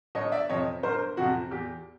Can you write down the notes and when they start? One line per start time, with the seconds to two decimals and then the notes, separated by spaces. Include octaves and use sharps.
0.15 G1 C#5 D#5
0.32 D5 E5
0.49 F2 C3 F3 C#5 D#5
0.83 G1 A#4 C5
1.17 F2 C3 F3 F#4
1.51 E2 G4